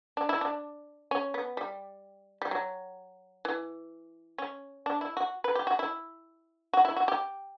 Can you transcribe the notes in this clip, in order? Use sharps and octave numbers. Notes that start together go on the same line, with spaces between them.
D4
E4
D4
C#4
B3
G3
G3
F#3
E3
C#4
D4
E4
F#4
B4
G4
F#4
E4
F#4
E4
F#4
G4